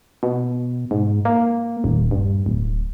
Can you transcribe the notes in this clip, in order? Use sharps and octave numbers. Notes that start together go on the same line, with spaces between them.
B2
G#2
A#3
D#1
G2
D1